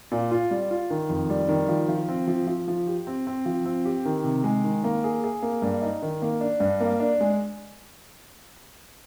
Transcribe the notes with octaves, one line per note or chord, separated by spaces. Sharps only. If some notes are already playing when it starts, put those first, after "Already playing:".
A#2
F4
G3
F4
D#3
F2
G3
D#3
F3
F3
C4
F3
F3
F3
G4
C4
C4
F3
C4
G4
D#3
C3
G#3
D#3
A#3
G#4
G#4
A#3
G2
D#4
D#3
A#3
D4
G2
A#3
D4
G#3